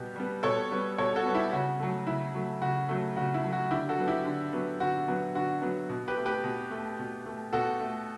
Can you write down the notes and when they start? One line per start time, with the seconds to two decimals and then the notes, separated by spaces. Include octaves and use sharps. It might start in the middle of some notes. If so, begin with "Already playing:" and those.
Already playing: B2 G3 B3 G4
0.16 G3 B3
0.43 B2 A4 C#5
0.71 G3 B3
0.98 B2 A4 C#5
1.16 F#4 A4
1.26 G3 B3
1.34 E4 G4
1.52 C#3 F#4
1.80 F#3 A3
2.07 C#3 E4
2.34 F#3 A3
2.61 C#3 F#4
2.89 F#3 A3
3.16 C#3 F#4
3.34 E4
3.44 F#3 A3
3.53 F#4
3.71 D3 E4 G4
3.89 F#4 A4
3.98 F#3 B3
4.07 E4 G4
4.25 D3
4.53 F#3 B3
4.80 D3 F#4
5.08 F#3 B3
5.35 D3 F#4
5.62 F#3 B3
5.89 B2
6.08 G4 B4
6.17 A3
6.25 G4 B4
6.44 B2
6.71 A3
6.99 B2
7.26 A3
7.53 B2 F#4 A4
7.80 A3